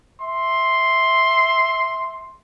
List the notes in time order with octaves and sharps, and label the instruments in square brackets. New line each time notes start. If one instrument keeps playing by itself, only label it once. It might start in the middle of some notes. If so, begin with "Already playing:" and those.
[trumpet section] E5 C6